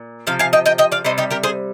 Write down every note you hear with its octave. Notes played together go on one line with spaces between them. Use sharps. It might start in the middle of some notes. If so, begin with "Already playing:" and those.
Already playing: A#2
C3 F3 F5
F5 G#5
D#5 G5
D#5 G5
D#5 G5
D5 F5
C3 G3 C5 D#5
D#4 G4
G4 A#4
G#4 C5